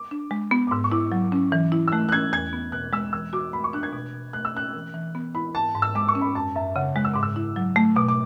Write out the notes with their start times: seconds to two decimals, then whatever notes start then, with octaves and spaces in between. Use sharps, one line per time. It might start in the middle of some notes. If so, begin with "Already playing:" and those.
Already playing: D6
0.11 D4
0.31 G#3
0.51 B3
0.67 D6
0.71 G#2 E6
0.84 C#6
0.92 E4 D6
1.12 F#3
1.32 C#4
1.52 E3
1.72 E4
1.88 E6
1.92 A3 F#6
2.09 F#6
2.12 C#4 G#6
2.33 E2 G#6
2.53 B3
2.72 B2 F#6
2.93 G#3 E6
3.13 E3 E6
3.33 F#4 D6
3.53 A3 B5
3.64 C#6
3.73 D4 F#6
3.83 G#6
3.93 B2
4.14 B2
4.33 A3 F#6
4.45 E6
4.54 C#4 F#6
4.75 E3
4.94 E3
5.15 B3
5.35 E4 B5
5.55 G#2 A5
5.75 G#2
5.82 E6
5.95 G#3 D6
6.08 C#6
6.15 C#4
6.21 B5
6.35 F#2 A5
6.55 F#2 E5
6.76 C#3 F#5
6.96 G#3 F#6
7.05 E6
7.13 G#2 D6
7.23 E6
7.36 E4
7.56 F#3
7.76 A3
7.96 B2 D6
8.08 D6